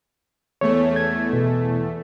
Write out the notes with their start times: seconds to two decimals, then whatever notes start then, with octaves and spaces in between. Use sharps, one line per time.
0.61 E2 A3 C#5
0.96 G#6
1.33 B2